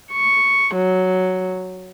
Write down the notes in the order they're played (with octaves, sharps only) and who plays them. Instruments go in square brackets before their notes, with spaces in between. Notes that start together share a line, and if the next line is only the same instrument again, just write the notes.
[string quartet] C#6
F#3